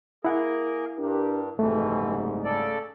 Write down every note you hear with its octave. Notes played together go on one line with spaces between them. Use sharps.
A#3 E4 G#4 A#4 F#5
G2 D4 G4 A#4
F#1 C2 F2 G#2 B2 E3 A3
C#3 A4 D5